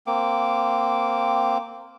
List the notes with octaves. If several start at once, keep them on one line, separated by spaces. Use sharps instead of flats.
A#3 C4 D6